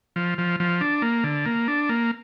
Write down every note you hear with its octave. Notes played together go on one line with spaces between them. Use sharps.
F3
F3
F3
D4
A#3
D3
A#3
D4
A#3